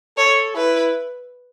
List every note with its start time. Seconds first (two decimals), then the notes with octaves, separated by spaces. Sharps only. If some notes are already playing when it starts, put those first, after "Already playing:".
0.17 A4 C#5
0.55 E4 B4